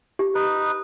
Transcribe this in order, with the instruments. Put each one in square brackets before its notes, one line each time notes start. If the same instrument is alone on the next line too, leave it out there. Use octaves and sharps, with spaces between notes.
[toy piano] G4
[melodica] D#4 B4